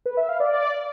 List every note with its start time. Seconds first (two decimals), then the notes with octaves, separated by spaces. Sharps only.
0.06 B4
0.17 E5
0.28 F5
0.40 D5